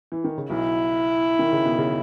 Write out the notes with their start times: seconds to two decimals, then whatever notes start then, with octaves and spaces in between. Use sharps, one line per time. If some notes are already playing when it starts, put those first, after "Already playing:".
0.12 E3
0.24 D#3
0.38 C#3
0.49 B1 B2 E4
1.39 D#3
1.53 C#3
1.65 B2
1.78 C#3